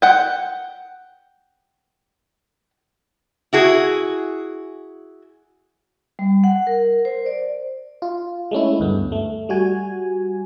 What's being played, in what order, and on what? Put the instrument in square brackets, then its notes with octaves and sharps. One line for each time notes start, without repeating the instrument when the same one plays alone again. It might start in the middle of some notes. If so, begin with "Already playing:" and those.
[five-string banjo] F#5 G5
[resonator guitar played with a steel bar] E4 F#4 G#4
[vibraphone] G3
F#5
A#4
C5
D5
[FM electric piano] F4
G#3 A3 C#4 E4
D2 G2 B3
A3
G3 F#4 G#5